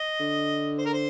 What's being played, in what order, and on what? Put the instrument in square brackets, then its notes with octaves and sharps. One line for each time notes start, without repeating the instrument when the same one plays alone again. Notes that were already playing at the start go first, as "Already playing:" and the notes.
Already playing: [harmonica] D#5
[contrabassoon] D3
[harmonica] C5
A#4
C5